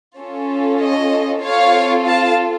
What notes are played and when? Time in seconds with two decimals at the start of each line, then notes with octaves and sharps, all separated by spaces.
0.19 C#4 F4 A4
0.81 D#5
1.44 C4 F4 A4 C#5 F5
2.07 F5 A5